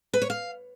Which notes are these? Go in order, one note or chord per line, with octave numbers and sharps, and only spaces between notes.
B4
C#5
F5